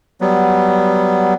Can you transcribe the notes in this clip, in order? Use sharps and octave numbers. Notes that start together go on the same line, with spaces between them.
F#3 G3 B3